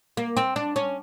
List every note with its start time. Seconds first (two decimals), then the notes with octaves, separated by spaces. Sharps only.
0.17 A#3
0.37 C4
0.56 D4
0.76 C#4